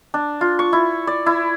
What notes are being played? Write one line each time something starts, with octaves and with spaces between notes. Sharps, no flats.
D4
F4
C#6
E4
D5
E4